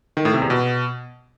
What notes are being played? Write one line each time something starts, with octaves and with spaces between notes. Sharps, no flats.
D#3
A2
C3
E2
B2